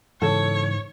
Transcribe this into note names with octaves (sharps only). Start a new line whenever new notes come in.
G#2 C#3 E3 G#3 A4 C#5